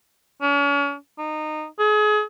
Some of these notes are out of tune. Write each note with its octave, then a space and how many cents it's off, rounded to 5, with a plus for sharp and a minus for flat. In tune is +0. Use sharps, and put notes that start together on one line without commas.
C#4 +40
D#4 -20
G#4 +30